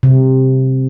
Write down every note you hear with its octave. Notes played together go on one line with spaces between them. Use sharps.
C3